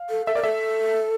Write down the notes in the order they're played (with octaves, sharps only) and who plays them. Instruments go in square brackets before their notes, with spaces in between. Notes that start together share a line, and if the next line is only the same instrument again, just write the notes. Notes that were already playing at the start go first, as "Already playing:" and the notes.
Already playing: [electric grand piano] F5
[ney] A4
[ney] A4 [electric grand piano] E5
[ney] A#4 [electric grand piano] D5
[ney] A4 [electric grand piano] E5